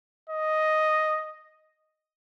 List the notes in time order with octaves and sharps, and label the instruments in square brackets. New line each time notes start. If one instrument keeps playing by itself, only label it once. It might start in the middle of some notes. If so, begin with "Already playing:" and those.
[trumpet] D#5